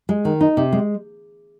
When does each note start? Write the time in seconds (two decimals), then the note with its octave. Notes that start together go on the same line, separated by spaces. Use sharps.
0.09 G#3
0.25 D#3
0.41 D#4
0.57 C3
0.72 G#3